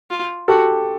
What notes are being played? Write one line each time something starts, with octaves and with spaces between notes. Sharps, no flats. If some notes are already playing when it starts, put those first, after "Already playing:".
F4
F#4 G4 A4